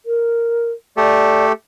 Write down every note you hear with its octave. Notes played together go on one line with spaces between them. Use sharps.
A#4
A3 G4 A4 D5